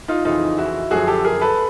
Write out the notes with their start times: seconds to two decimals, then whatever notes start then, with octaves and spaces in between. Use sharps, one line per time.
0.08 D#4 F4
0.25 F2 C#3 E3 D#4 F4
0.58 E4 F#4
0.91 F#2 D3 F3 F#4 G#4
1.08 G4 A4
1.25 G#4 A#4
1.41 A4 B4